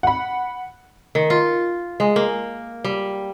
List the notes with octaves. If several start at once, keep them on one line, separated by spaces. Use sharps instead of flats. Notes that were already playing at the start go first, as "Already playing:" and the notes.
F#5 B5
D#3
F4
G#3
A#3
G3